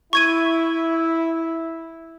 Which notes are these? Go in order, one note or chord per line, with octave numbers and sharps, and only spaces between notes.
E4 C#6 G#6 D#7